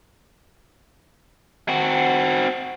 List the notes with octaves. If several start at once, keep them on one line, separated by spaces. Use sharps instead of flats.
C4 F#4